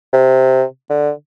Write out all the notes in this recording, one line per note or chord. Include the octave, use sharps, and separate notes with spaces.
C3
D3